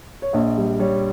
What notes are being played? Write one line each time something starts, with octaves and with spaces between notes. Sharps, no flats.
C#5
A#1 D#5
G3
G3 C#5